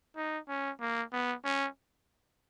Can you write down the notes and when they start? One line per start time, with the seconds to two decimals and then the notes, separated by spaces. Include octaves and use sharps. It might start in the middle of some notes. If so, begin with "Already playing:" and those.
0.16 D#4
0.49 C#4
0.80 A#3
1.13 B3
1.45 C#4